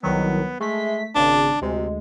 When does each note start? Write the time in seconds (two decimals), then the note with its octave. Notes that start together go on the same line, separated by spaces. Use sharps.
0.03 C2 D#3 F#3 B3
0.60 G#3 A3 B6
1.15 G#1 C#3 D4
1.61 D2 C3 G#3